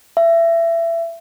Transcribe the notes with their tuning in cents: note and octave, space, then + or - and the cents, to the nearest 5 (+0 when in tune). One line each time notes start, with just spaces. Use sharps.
E5 +25